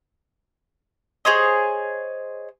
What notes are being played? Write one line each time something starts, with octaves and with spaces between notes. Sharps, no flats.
G#4 C5 C#5 D#5